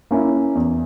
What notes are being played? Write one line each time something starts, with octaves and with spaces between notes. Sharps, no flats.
A#3 C#4 E4
E2